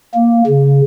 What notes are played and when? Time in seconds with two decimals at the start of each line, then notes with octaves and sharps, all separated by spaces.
0.15 A#3
0.47 C#3